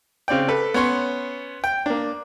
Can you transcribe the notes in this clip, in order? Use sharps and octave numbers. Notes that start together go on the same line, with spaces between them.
C#3 C4 D5 G5
A4 B4
B3 C#4 C#5 C6
G5
A#3 D4